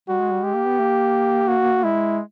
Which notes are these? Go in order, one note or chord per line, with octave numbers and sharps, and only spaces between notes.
G3 F#4
G#3
G3
G#3 G4
A#3
B3
A#3
F#4
G#3 E4